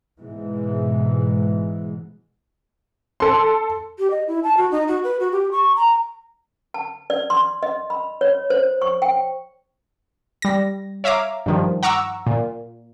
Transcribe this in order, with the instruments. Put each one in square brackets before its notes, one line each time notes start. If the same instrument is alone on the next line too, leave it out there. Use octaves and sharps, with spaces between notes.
[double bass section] G#2 B2 E3 G#3
[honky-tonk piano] A4 C6
[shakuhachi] G4
D#5
E4
A5
F#4
D#4
F#4
B4
F#4
G4
C#6
A#5
[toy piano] A5
D5
C6
D#5
B5
C#5
C5
C#6
G5
[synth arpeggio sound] G3 A#6
C#5 E5 F5 A#5 D6
G2 D#3 F3
F#5 A#5 C#6 D6 E6
A#2